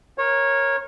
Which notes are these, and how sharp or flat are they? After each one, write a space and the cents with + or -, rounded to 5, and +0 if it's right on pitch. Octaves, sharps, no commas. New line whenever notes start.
A#4 +10 C#5 -15